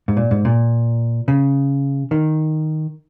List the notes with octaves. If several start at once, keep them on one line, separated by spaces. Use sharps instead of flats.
G#2
A#2
G#2
A#2
C#3
D#3